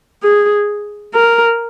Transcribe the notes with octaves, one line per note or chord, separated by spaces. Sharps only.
G#4
A#4